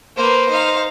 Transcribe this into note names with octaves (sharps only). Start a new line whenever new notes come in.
A#3 B4 C5
D#4 F5